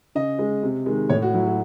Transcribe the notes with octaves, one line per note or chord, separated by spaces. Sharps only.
C#3 D#5
G#3
C3
D#3 G#3
A2 C#5
F#4
F#3 E4
F#4